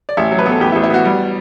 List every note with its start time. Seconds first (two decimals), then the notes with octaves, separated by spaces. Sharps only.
0.09 D5
0.17 A1 E5
0.31 F#3
0.39 B4
0.46 B3 A4
0.60 A1 G4
0.72 E4
0.76 A1
0.83 E4
0.90 B3 F#4
1.05 G3